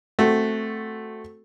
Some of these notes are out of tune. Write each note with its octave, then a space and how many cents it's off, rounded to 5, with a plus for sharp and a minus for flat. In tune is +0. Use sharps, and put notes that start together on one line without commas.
A3 +0 C4 +0 F#4 +0